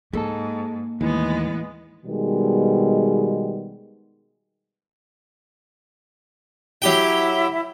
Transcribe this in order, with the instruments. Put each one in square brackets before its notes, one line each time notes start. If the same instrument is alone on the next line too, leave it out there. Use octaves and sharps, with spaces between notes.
[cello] G#2 [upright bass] A#3 [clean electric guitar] G#4 A4 A5
[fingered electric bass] D#2 [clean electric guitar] A2 E3 E4 [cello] G#3 B3
[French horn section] B2 D#3 G3 G#3 B3
[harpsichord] F#3 G4 G5 [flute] E4